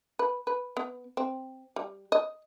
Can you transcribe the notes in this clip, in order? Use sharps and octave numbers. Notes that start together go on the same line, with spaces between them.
B4
B4
B3
C4
G3
D#5